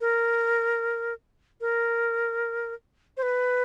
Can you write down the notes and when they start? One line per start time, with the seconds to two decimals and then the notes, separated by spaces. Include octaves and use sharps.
0.01 A#4
1.61 A#4
3.17 C5
3.23 B4